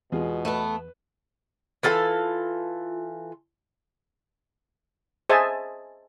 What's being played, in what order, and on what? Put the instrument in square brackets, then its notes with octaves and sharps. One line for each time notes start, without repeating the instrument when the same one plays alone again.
[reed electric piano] E2 [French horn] B2 [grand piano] G#3 F4 G#4
[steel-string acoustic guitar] A3 B3 [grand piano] B4
[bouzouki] E3 F4 A4 A5
[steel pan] G#4 C5 D#5 E5 G#5 A5